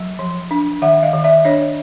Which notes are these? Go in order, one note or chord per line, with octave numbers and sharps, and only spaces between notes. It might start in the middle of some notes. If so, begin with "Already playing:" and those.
Already playing: F#3
F3
D4
D#3 E5 F#5
D#5 F5
D#3
D5 E5
D4 C#5 D#5